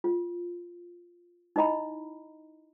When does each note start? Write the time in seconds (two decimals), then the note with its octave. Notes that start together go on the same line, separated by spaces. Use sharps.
0.04 F4
1.56 D#4 E4 D#5 A#5 B5